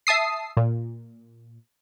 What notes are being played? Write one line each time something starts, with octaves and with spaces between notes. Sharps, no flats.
E5 A5 D#6 C7
A#2